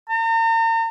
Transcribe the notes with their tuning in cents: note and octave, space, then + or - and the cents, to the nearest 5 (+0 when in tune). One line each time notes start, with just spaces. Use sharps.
A#5 -40